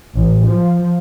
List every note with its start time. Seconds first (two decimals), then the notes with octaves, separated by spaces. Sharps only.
0.14 A1
0.45 F3